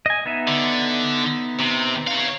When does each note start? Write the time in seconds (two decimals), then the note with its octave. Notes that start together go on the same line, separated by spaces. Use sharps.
0.06 D#5 G#5
0.26 B3 D#4 E5
0.48 D3
1.59 C3
2.07 C#5 F5